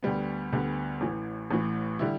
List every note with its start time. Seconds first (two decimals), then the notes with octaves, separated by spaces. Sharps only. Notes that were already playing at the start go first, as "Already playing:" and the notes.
0.03 D2 D3 G3 B3
0.52 D2 D3 G3 B3
1.01 A1 A2 E3
1.51 A1 A2 E3
1.99 D3 G3 E4